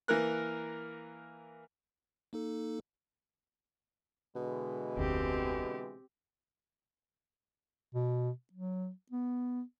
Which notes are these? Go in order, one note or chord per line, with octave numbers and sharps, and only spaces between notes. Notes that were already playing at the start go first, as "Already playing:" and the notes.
E3 A#3 A#4 F#6
A#3 D#4 A4
B2 D3 E3 G#3
F1 D2 C4 G4
B2
F#3
B3